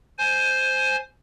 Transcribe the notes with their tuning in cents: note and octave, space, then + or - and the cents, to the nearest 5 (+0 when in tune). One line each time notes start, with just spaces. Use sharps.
C5 +0 G#5 +20